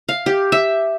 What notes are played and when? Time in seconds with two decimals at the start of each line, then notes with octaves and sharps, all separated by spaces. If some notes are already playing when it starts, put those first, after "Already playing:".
0.09 F5
0.26 G4
0.52 E5